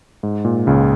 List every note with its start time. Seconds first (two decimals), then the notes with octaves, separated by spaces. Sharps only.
0.23 G#2
0.45 A#2
0.67 C#2 C#3